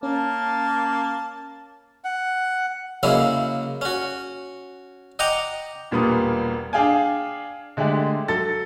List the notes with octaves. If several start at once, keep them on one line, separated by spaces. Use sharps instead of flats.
A#3 C#4 A5
F#5
C#3 F#3 G#3 A#3 E4
C#4 F#4
D#5 F#5 G5 A#5 D6 D#6
E1 A#2 G3 A#3 B3 D#6
D4 G#4 F5 G5 G#5
D3 G#3 A3 D4 G4
F#3 A4 A6